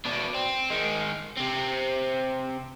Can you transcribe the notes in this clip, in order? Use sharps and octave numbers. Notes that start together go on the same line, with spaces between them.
B2 D4
C4
D#3 G#3
C3 C4